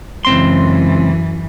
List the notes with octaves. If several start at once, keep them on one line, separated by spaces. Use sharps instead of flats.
C#2 F#2 E3 C4 C6